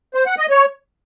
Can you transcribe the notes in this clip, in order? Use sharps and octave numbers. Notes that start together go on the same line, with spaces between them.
C5
F#5
D#5
C#5